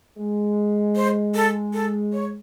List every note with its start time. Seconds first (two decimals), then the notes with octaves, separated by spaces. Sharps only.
0.18 G#3
0.96 C5
1.35 A4
1.73 A4
2.13 C#5